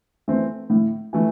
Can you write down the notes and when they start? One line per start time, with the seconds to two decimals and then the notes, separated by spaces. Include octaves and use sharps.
0.28 E3 A3 C4
0.70 A2
1.13 E3 A3